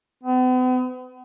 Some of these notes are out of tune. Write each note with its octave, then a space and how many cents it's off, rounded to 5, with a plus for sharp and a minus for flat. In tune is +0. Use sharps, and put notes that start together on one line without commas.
B3 +45